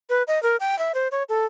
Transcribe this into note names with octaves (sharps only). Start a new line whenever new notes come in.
B4
D#5
A#4
G5
E5
C5
C#5
A4